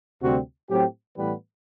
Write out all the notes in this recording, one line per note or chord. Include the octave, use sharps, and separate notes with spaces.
D2 C3 G3 C4 F#4
A2 F#3 C4 G4
A2 E3 G3 B3 B4